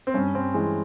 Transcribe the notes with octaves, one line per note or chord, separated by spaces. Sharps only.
C4
G2 C#4
G2 C4
E3 G#3